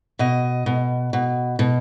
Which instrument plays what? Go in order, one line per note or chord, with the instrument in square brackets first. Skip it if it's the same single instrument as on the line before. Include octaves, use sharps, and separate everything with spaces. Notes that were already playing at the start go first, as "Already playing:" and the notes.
[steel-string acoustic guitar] B2 D#5
B2
B2
B2